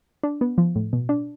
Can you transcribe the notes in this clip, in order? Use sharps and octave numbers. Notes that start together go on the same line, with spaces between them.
D4
B3
F3
A2
B2
D4